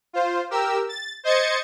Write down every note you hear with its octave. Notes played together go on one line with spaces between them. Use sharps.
F4 C5
G4 A#4 E6
A6
C5 D#5 G#6 A6 C#7